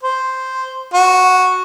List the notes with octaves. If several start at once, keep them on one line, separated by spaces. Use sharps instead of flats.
C5
F#4